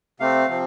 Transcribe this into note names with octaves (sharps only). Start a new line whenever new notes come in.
C3 A3 C4 F5
C3 F3 C4